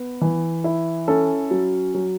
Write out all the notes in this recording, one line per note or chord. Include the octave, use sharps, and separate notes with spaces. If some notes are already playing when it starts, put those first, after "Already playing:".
Already playing: B3
E3
E4
C#4 A4
F#3
F#3